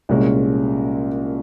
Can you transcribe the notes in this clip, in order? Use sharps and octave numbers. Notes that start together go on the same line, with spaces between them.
C2 A#2 G#3 C#4